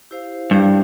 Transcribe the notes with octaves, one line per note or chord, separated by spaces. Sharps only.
E4 G4 C5 F5
G2 E4 G4 C5 F5